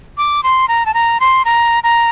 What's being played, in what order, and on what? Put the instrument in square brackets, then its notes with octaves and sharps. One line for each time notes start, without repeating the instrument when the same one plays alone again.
[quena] D6
C6
A#5
A5
A#5
C6
A#5
A#5